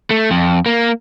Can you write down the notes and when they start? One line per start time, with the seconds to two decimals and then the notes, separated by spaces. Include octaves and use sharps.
0.11 A3
0.31 F2
0.66 A#3